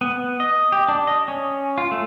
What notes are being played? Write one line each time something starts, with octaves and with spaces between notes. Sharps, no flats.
B3
D#5
G4
D4
D#5
C#4
F4
A3